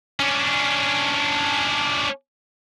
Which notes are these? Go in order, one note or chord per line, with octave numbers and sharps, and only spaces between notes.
C#4 D4